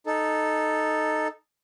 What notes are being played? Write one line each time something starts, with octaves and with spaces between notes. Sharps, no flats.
D#4 A4